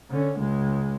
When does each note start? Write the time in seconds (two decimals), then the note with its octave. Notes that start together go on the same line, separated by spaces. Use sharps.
0.10 D3 C#4
0.39 C#2 G#3